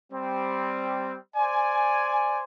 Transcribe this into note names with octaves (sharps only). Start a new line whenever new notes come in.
G3 C4
C5 D5 G#5